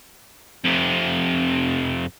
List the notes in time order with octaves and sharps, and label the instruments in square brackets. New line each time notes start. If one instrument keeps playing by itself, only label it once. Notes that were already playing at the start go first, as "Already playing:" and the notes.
[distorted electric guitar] F2 C3